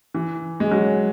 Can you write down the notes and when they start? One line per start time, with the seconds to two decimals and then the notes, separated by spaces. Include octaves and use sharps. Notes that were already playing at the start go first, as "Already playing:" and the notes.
0.14 E3
0.60 G#3
0.71 F#3